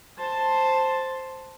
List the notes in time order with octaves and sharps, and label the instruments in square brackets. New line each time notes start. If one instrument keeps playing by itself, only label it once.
[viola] C5 A5